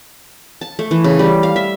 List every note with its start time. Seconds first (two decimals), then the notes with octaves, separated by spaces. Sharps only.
0.61 A5
0.79 A3
0.91 E3
1.04 C#3
1.19 G3
1.43 F5
1.56 E5